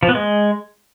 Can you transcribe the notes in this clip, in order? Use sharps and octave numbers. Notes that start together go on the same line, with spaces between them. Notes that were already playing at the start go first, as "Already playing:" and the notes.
F3
B3
G#3